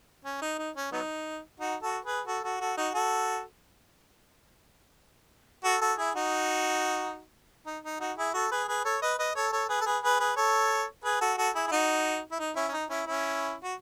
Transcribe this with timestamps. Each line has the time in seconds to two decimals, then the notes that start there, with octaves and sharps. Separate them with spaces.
0.25 C#4
0.42 D#4
0.58 D#4
0.76 C#4
0.92 F#3 B3 D#4
1.60 D#4 F#4
1.82 F#4 A4
2.05 G#4 B4
2.27 F#4 A4
2.44 F#4 A4
2.61 F#4 A4
2.77 D#4 F#4
2.94 F#4 A4
5.64 F#4 A4
5.81 F#4 A4
5.98 E4 G#4
6.15 D#4 F#4
7.66 D#4
7.84 D#4
8.00 D#4 F#4
8.17 E4 G#4
8.34 F#4 A4
8.51 G#4 B4
8.68 G#4 B4
8.85 A4 C#5
9.02 B4 D#5
9.19 B4 D#5
9.35 A4 C#5
9.52 A4 C#5
9.69 G#4 B4
9.81 A4
9.86 G#4 B4
10.03 G#4 B4
10.20 G#4 B4
10.36 A4 C#5
11.04 G#4 B4
11.21 F#4 A4
11.38 F#4 A4
11.55 E4 G#4
11.68 E4
11.71 D#4 F#4
12.31 E4
12.39 D#4
12.56 C#4 E4
12.68 C#4
12.73 D#4
12.90 C#4 E4
13.07 C#4 E4
13.64 F#4